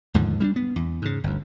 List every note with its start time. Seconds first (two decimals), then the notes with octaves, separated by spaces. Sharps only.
0.14 D#2 G#2 D3 F3
0.40 G3 C#4 D4
0.56 B3
0.76 E2
1.02 G#2 C#3
1.24 G1 D2